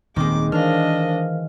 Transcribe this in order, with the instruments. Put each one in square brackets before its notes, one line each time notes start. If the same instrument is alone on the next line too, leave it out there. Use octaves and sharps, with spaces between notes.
[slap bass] D#1 C4 [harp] D#3 G#3 [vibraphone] A#3 D#4 [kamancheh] D6
[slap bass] E3 [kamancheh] D4 D#5 [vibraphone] A#4 C5 F5 [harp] F6